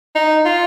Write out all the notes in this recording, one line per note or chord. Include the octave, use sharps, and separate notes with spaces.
D#4
F4